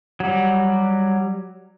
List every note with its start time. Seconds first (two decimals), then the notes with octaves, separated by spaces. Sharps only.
0.20 F#3 G3